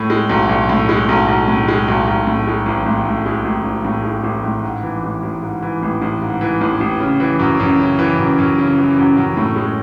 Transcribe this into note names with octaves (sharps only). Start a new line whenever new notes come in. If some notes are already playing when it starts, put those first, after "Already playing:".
Already playing: A2
G#3
B1
B1
A2
G#3
B1
B1
A2
G#3
B1
B1
A2
G#3
A1
A1
A2
G#3
A1
A1
A2
G#3
A1
A1
G#2
E3
A1
A1
G#2
E3
A1
A1
G#2
E3
A1
A1
C#3
E3
F#2
F#2
C#3
E3
F#2
F#2
C#3
E3
F#2
F#2
A2
G#3